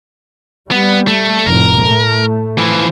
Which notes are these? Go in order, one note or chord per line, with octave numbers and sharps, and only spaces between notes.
G3 B3
A3
F1 A2 A#4
A2 A3
E3 F3